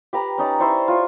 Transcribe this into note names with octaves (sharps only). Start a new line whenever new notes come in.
G4 B4 A#5
C#4 D#4 D5
E4 C5 D5 C#6
F4 C#6